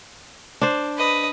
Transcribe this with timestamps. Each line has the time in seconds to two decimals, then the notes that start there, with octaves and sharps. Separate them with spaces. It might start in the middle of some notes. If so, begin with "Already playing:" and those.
0.61 D4 C5
0.98 B4 D#5